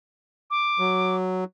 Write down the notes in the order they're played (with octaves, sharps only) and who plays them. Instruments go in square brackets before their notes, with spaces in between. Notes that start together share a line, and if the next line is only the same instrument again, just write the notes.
[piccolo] D6
[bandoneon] F#3